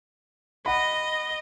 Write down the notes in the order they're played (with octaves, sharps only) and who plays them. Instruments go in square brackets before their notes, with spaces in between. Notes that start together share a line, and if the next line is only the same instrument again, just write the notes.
[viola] D#5 [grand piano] F#5 B5